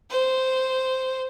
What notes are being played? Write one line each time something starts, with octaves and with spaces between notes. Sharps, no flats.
C5